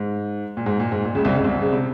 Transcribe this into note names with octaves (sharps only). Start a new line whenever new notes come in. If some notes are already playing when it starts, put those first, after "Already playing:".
Already playing: G#2
A#2
G#2
A#2
G#2
A#2
C#2 C#3
C2 C3
C#2 C#3
C2 C3
C#3
C3